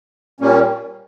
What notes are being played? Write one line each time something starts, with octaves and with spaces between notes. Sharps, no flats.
A#2 G3 A#3 C#4